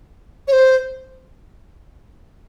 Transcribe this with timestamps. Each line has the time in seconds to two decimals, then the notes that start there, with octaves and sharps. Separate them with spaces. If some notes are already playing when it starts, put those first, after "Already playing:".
0.48 C#5
0.52 C5